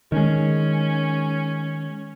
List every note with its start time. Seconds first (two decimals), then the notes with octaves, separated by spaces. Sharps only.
0.12 D#3 G#3 C#4